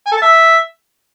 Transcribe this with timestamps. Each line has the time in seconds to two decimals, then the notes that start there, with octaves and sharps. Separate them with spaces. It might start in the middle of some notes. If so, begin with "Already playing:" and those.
0.07 G#5
0.12 A4
0.17 A5
0.22 E5